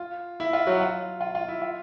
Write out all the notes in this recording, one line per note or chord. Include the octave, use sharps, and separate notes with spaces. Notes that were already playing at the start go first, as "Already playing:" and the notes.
Already playing: F4
E4
F4
F#3 F#4
F4
F4
F4
E4
F4